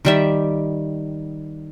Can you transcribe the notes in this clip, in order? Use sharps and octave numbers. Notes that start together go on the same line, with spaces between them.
D#3 G3 E5